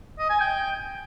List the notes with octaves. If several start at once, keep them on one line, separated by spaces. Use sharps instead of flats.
D#5
G#5
G5